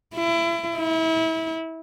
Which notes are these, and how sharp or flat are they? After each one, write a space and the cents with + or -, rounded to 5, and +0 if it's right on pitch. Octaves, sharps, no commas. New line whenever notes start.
E4 +30
E4 -30